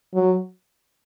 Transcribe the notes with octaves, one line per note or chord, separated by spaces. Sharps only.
F#3